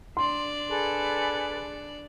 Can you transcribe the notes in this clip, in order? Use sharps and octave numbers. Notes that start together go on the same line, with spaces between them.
D4 D5 C6
G#4 A4 B4